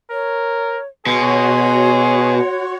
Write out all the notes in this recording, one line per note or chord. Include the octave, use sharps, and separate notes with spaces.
A#4 C#5
B2 F#4 G#4 C#5 C6